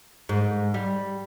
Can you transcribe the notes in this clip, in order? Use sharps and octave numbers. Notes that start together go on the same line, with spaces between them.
G#2
G3